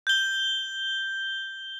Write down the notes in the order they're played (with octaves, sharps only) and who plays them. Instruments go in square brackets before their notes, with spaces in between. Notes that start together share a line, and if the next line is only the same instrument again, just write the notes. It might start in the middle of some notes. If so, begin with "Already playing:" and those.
[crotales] G6 G7